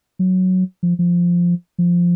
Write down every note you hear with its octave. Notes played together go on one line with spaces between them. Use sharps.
F#3
F3
F3
F3